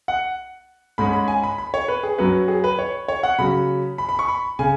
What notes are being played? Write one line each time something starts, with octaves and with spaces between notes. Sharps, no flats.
F#5
G#2 G#3 C#4 B5
B5
G#5
B5
B5
C#5
B4
G#4
F#2 F#3 C#4 B4
G#4
B4
C#5
C#5
F#5
C#3 F#3 C#4 B5
B5
B5
C#6
B5
C#3 G#5